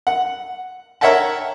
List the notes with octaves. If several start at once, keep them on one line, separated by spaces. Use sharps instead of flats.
F#5
A#4 C#5 E5 F#5 G5 A5